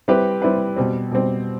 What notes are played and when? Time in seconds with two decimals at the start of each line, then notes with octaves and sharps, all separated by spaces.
0.08 G3 C4 E4 G4 B4
0.42 G3 C4 E4 G4 B4
0.76 B2 G3 C4
1.11 B2 G3 C4